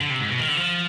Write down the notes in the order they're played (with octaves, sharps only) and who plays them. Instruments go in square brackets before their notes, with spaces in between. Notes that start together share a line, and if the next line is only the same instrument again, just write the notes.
[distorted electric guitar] D3
C3
G#2
B2
D#3
D3
F3